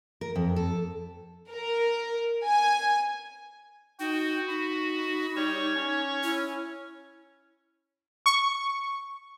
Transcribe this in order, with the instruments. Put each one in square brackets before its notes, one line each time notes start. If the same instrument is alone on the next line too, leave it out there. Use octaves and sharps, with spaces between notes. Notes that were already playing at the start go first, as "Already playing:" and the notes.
[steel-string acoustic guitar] A#4
F2
A4
[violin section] A#4
G#5
[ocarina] D#4 [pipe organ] F#4 [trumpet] G5
[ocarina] D#4 [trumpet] B5
[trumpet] G3 [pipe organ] C#5 C#6
[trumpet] C#4
[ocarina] E4
[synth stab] C#6